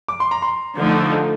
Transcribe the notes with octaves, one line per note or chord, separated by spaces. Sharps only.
D6
C6
A#5
C6
D3 F3 A3 D#4